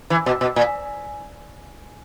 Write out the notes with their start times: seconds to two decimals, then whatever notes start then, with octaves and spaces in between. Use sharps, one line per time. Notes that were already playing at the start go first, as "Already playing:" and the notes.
0.10 E3
0.26 B2
0.41 B2
0.56 A#2